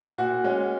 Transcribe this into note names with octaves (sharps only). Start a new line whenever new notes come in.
A#2 F#4
G#3 C#4